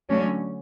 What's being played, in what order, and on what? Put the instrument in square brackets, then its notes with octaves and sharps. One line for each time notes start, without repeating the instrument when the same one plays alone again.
[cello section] D3 F#3 A3 C#4